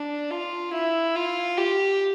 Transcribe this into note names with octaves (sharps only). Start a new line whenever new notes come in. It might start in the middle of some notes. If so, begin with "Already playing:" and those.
Already playing: D4
F4
E4
F4
G4